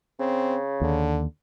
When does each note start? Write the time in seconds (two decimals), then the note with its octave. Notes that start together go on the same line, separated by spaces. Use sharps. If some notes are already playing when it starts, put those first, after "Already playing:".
0.20 C#3 C4
0.81 D#2 D3